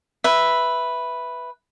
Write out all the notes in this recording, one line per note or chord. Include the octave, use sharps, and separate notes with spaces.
B4 E5